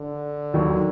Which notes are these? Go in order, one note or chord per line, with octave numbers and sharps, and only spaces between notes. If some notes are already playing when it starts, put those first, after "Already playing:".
Already playing: D3
D#2 D#3 F#3